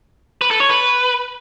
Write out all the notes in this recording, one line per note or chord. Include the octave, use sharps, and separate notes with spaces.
B4
A4
C#5
B4